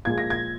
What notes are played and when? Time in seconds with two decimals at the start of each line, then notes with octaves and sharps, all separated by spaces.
0.05 A#2 F3 G#3 G#6
0.18 A#6
0.30 G#6